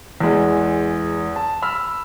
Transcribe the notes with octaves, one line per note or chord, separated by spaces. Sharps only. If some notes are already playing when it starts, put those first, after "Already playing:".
E2 G#3
A5
B5 E6 F6